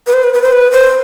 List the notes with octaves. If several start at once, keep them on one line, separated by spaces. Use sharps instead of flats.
B4
C5
B4
B4
C5
B4
C5